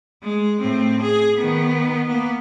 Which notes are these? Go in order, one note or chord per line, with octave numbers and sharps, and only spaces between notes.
G#3
A2 C4
G#4
D#3 B3
A#3 B3